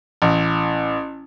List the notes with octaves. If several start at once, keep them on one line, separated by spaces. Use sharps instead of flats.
A1